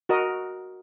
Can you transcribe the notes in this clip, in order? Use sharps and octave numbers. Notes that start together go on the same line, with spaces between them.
F#4 A#4 D#5